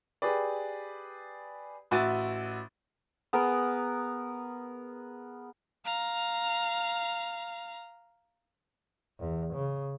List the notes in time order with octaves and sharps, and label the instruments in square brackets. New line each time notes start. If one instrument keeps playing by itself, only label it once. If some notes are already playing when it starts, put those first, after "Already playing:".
[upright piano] G4 G#4 B4 D5
A1 F#4 E5 F#5 A6 D#7
[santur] B3 G#4 A#4
[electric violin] F5 A#5
[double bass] E2
C#3